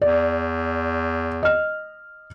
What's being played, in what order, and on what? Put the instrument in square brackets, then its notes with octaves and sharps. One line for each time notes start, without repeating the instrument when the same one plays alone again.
[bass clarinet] E2 [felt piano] D5
[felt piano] D#5 F6